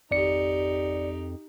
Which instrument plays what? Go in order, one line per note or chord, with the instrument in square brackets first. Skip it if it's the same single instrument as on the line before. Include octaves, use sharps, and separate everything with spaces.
[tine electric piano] G#1 D5 C#7 [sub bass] F2 [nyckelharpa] D#4 G4